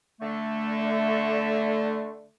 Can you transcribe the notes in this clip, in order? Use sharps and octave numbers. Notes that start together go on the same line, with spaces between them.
D3 A3